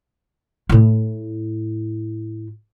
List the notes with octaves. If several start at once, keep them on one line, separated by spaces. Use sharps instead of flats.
A2 E4